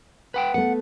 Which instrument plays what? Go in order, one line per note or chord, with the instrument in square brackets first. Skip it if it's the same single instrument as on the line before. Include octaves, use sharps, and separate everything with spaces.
[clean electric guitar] B4 F#5 G5
[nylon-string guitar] A3 B3 B4 [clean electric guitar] F#5